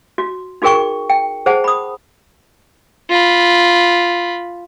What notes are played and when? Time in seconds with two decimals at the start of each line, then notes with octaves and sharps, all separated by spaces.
0.18 F#4
0.62 D#4 F#4 G#4 A#4 G5 C#6
1.09 G5
1.46 G#4 C5 F#5 A5
1.64 B5 D#6
3.10 F4 B5